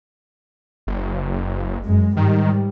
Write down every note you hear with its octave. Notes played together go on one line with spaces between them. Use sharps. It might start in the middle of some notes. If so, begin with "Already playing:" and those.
F#1
F#2 G#3
G#2 D#3 G3